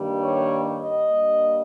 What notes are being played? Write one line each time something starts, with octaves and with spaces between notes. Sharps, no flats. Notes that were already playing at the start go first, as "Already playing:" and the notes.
Already playing: G2 D#3 G3 A#3
C#5
D#5
G2 G3 A#3